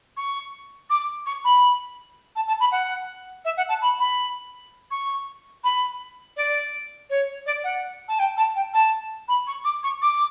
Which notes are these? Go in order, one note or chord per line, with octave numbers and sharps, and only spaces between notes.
C#6
D6
C#6
B5
A5
A5
B5
F#5
E5
F#5
A5
B5
B5
C#6
B5
D5
C#5
D5
F#5
A5
G5
A5
G5
A5
B5
C#6
D6
C#6
D6